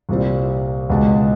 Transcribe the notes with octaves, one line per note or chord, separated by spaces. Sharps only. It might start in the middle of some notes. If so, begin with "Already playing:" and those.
C2 A#2 G3 C4
C#2 B2 G#3